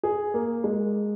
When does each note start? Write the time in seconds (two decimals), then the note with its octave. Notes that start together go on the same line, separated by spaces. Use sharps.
0.03 G#4
0.34 A#3
0.64 G#3